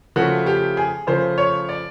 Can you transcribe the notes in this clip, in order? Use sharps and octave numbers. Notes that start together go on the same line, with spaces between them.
C#3 F3 A3 F#4
G4
G#4
C#3 F3 A3 C5
C#5
D5